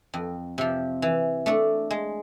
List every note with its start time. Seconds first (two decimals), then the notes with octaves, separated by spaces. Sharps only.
0.14 F2
0.58 C3 F3
1.02 E3
1.46 A3 D4 A4
1.91 G#3